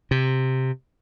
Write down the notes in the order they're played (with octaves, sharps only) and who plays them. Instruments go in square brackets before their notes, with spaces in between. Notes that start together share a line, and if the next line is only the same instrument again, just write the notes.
[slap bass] C3